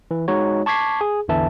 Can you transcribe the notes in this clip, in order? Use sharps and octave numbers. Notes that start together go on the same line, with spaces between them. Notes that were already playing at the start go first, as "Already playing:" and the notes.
E3
G#3 D#4 F#4 C#5
A5 C#6 D6 G#6 B6 C7
G#4
A1 E2 D3 E3 E5 A5